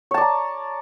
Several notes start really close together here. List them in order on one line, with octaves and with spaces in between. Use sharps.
C#5 A5 D5 A#5